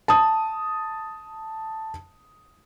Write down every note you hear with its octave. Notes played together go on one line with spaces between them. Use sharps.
A5 D#6